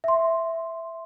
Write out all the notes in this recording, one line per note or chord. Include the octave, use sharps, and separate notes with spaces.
E5 C6